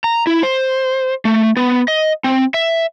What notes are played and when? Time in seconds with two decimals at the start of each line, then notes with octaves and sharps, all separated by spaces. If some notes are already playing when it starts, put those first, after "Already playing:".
0.04 A#5
0.27 E4
0.43 C5
1.25 A3
1.57 B3
1.88 D#5
2.24 C4
2.54 E5